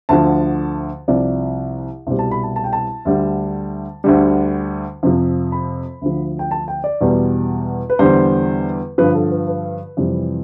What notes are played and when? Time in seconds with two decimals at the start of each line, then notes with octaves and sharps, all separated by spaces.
0.09 D2 D3 F3 A5
1.08 C2 C3 F3 D5
2.07 C2 B2 G3 C5
2.19 A5
2.31 B5
2.43 A5
2.56 A5
2.64 G5
2.73 A5
3.05 D2 D3 G3
4.04 D2 D3 G3
5.03 F2 C3 F3
5.52 B5
6.01 D2 D3 F3
6.39 G5
6.51 A5
6.68 G5
6.84 D5
7.01 E2 B2 G3
7.90 B4
7.99 E2 D3 G3 C5
8.98 G2 D3 F3 B4
9.15 A4
9.31 B4
9.48 B4
9.97 F2 C3 E3 G3